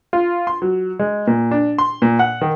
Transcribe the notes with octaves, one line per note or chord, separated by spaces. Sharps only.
F4
C6
F#3
G#3
A#2
D4
C6
A#2
F#5
D#3